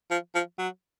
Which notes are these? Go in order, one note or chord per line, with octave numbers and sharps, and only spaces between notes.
F3
F3
F#3